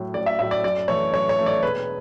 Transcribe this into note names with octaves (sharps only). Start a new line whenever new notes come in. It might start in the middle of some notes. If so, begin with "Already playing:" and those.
Already playing: A2 F#3
A1 D5
E5
A2 F#3 E5
D5
F#2 D5
E3 A3 C#5
F#2 C#5
C#5
E3 A3
D5
E1 B4